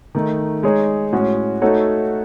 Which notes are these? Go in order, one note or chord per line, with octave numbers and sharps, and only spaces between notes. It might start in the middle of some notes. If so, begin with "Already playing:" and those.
D#3 A3 D#4
G#3 D#4 G#4 C#5
A2 G#3 C#4 F#4
A3 D#4 F#4 A4 C#5